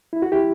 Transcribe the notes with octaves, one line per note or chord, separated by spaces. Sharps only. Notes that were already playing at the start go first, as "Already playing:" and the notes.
E4
F#4
E4 G4